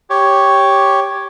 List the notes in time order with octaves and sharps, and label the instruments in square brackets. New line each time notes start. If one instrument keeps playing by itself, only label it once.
[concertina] G4 C#5